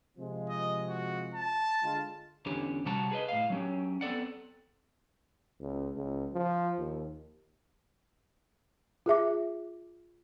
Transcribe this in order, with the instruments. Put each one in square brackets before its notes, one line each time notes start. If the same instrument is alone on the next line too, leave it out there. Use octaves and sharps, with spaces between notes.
[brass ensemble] C3 F3 G#3
[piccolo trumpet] D#5
F#4
A5
[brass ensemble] D3 G#3 F4
[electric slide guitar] E2 D3 C#4 G4
C3 G3 F#4 F#5 A5 A#5
G#4 B4 D#5
A2 F5
F#3 C#4 G4
B3 C4 A4 D5 F#5
[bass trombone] C#2
C#2
F3
D#2
[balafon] F4 G#4 E5 D6